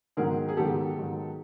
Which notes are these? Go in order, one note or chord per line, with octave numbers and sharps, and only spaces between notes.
G#2 D#3 F#3 B3 G#4 A#4
G#4
G#2 D#3 F#3 B3 G4 A4
G#2 D#3 F#3 B3